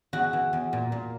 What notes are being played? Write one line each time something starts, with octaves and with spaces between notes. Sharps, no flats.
E2 F#4
E3
E2
A#2
A#2